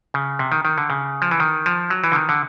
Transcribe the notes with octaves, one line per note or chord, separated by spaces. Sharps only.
C#3
C3
D#3
D#3
D3
C#3
F3
E3
D#3
F3
F#3
E3
D3
D#3
D3